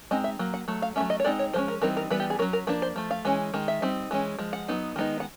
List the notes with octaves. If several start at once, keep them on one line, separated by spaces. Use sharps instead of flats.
G#3 C4 D#4 D#5
E5
F#3 A#3
F#5
F#3 A3
F5
F#3 A3 C#4 E5
D#5
C#5
G#3 C4 D#4 D5
C#5
F3 G#3 C#4 C5
A#4
E3 G3 C4 D#4 A#4
A#4
E3 G3 B3 B4
G4
G#4
F#3 A#3 C#4 A#4
A#4
F3 A#3 D4 B4
C5
F3 A3
F5
E3 G#3 C#4
D#3 G#3
E5
G3 C4 D#4
E3 G#3 C#4
F3 G#3
F#5
F#3 B3 D#4
D#3 G#3 B3 D#4
F#5